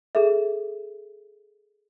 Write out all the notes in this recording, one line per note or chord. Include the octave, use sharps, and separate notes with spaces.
G#4 A4 E5